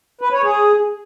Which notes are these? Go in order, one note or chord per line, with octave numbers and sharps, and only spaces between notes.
B4
C#5
G#4